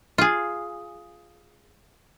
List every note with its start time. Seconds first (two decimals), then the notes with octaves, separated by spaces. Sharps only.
0.18 F4 G#4